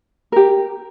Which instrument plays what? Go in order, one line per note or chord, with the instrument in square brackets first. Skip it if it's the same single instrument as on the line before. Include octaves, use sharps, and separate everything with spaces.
[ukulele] G4 A#4